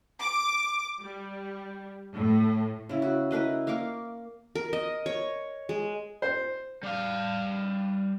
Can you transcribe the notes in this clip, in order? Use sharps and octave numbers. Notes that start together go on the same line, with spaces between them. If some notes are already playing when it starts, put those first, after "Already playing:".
D6
G3
A2
C#3 E4
F#4
E4 A#4 B4 D#5
A#3 F5 C#6 D6
A#4
D#5
C#5
G#3
C5
G3 F5